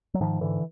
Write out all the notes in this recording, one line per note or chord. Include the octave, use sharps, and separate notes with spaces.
F#3
G#2 D#3 F3
G#2 D3 E3